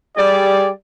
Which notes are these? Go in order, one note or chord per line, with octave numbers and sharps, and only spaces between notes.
G3 G4 G#4 D5